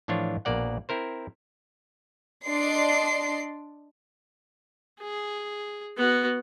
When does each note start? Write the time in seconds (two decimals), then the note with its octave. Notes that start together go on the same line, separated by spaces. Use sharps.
0.08 A2 E3 F3 D4 F4 C#5
0.45 A#1 B2 A#3 D5 F#5
0.89 C4 E4 A#4 C5
2.46 D4 D5 D#5 C6 C7
5.01 G#4
5.97 B3 F#4